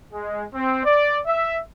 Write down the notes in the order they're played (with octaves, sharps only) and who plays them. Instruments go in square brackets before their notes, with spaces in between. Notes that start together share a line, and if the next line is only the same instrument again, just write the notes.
[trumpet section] G#3
C4
D5
E5